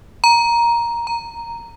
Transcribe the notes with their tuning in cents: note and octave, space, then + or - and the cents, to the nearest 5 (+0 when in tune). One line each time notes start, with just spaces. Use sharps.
A#5 +10
A#5 -5